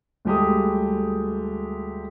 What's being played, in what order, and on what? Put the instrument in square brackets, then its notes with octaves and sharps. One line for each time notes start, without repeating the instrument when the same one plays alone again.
[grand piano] D2 G3 G#3 G4 A4 D#6